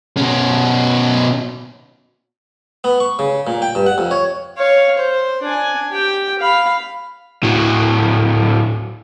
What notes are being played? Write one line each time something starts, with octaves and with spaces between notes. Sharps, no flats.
B2 C#4
B3
C#6
C#3
A#2
G5
G2
F#5
F2
C#5
C#5 F5
C5
D4 G#5
G4 G5
F5 B5
A2 F#3